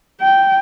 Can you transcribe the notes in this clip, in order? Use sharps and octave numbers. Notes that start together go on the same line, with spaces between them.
G5